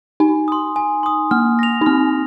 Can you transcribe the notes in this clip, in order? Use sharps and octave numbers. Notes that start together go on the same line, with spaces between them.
D#4 G#5
C6 D#6
G#5
C6 D#6
A#3 F6
A#6 F7
D#4
C4 F6